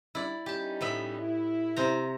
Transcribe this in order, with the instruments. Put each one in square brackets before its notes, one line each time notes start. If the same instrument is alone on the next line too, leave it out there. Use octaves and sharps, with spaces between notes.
[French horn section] G3 D4 [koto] E4 D5
[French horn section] G3 C#4 D#4 [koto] G4 A5
[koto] A2 B3 E5
[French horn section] E4
[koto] C3 C5 A#5